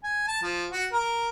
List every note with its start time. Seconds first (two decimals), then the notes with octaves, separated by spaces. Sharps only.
0.03 G#5
0.27 A5
0.43 F3
0.71 F#4
0.92 A#4